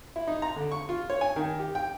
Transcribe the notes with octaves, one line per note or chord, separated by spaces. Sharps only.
E4
D#4
A#5
D3
C#6
F4
C#5
G#5
D#3
G4
G5